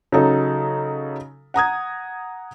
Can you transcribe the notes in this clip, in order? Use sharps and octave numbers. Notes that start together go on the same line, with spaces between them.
C#3 F#3 D#4 A4
F#5 A#5 D#6 G#6